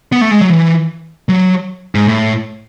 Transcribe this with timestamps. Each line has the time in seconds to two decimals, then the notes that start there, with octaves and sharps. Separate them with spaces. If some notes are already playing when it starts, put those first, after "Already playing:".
0.12 B3
0.21 A3
0.31 G#3
0.41 F#3
0.50 E3
1.29 F#3
1.95 G#2
2.08 A2